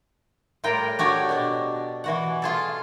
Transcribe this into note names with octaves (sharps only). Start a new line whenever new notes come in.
A2 G3 F4 A#4 G5
D4 F#4 G4 C#5 D#5
B2 D4
E3 F#4 F#5
F4 G#4 A4